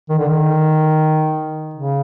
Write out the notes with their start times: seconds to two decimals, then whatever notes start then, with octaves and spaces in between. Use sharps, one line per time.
0.09 D#3
0.19 D3
0.29 D#3
1.74 C#3